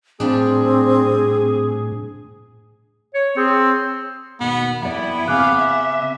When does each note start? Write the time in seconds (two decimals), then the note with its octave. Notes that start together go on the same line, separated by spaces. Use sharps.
0.20 A2 F3 G3 C4 D4 G#4
3.14 C#5
3.37 C4 G#4
4.40 D#2 B2 B3
4.82 F2 B3 E4 D5
5.28 C#3 C4 F5 G#5 D6 F#6
5.59 E5